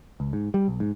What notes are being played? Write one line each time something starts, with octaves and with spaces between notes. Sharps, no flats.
C#2
G#2
G3
B1
G#2